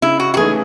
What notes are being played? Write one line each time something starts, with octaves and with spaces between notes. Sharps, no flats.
C#3 E4
F#4
F#4
E3 A3 D#4 G#4